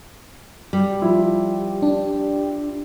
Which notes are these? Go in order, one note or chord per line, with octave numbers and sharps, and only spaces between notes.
G3 G4
F3 E4
D4